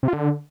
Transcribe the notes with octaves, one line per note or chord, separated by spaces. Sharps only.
C3
F4
D3